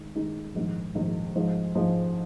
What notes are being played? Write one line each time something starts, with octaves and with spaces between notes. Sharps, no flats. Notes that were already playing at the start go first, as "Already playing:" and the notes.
Already playing: D#3 G#3 D#4
D#3 G#3 D#4
A#1 G#2 D#3
A#1 G#2 D#3
G#2 F3 G#3
G#2 F3 G#3